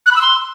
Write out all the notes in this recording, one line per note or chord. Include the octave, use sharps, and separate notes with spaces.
F#6
B5
E6
C6